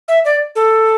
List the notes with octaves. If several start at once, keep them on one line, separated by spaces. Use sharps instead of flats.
E5
D5
A4